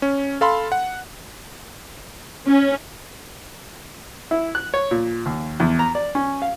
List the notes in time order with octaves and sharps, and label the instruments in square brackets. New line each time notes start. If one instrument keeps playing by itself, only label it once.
[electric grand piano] C#4
A4 F5 B5 C6
F#5
[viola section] C#4
[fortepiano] E4
F#6
C#5
A#2
D#2
E2
A#5
D5
C#4
F5